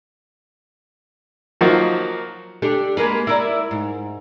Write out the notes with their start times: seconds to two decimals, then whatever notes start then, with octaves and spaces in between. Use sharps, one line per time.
1.61 F3 F#3 A#3 D#4 F#4
2.62 D4 G4 A4
2.97 G#3 A#3 B4
3.27 E4 A#4 D5
3.71 G#2